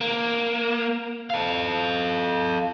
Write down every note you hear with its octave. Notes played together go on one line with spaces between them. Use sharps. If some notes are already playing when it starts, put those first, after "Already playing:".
A#3
A4 F5